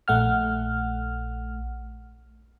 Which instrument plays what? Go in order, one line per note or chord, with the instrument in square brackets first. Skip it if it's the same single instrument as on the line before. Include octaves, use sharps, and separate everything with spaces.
[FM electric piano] A#1 A3 F#5 F6